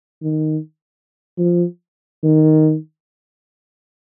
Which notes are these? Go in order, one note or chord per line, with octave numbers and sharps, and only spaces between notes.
D#3
F3
D#3